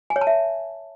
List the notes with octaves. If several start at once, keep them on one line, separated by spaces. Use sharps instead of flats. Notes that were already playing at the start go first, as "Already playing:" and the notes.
G#5
C#5
A5
E5